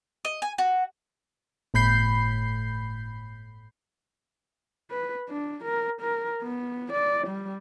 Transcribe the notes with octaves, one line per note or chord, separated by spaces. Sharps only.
D#5
G#5
F#4
G1 A2 B5 G6 C7
B4
D4
A#4
A#4
B3
D5
G3